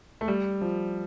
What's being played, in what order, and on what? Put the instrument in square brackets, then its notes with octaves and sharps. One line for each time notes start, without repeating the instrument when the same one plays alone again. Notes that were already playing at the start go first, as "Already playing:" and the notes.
[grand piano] A3
G3
F3